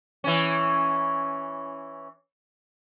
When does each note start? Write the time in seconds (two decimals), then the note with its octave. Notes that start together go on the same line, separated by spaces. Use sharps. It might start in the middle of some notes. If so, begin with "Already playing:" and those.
0.24 E3 C#4